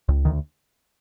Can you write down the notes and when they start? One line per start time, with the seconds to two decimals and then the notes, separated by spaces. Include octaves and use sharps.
0.09 C#2
0.25 D2 D#3